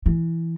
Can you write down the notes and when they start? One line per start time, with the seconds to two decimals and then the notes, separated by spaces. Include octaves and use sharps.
0.06 E3